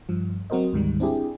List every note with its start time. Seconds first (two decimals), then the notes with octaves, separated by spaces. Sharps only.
0.09 G2 F3
0.50 F#3 C4 F#4 A#4 C5 D#5
0.73 D2 G#2 D#3 G3
1.00 C4 D4 E4 G4 G#4